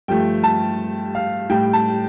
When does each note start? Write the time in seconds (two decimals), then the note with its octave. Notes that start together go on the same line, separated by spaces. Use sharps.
0.08 G2 F3 A3 G5
0.44 A5
1.15 F5
1.49 A2 G3 G5
1.73 A5